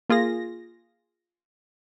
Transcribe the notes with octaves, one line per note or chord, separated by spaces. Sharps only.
A#3 F4 G#4 A#6